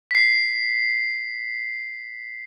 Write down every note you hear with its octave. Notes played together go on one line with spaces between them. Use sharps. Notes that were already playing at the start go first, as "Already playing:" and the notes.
B6 C7